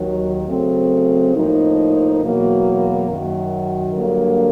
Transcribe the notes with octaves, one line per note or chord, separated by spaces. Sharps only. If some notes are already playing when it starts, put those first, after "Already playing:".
Already playing: D#2 D#3 F#3
C#3 F#3 A3 C4
A2 F3 A#3 D#4
E2 B2 F#3 A#3
F#2 D#3 F#3
G2 D3 F#3 A#3